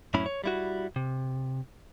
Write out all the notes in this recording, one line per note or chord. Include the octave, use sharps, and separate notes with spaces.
F#2 A2 C#4 E4 B5
C#5
G3 E4 F#4
C3